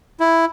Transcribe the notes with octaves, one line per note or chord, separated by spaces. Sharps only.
E4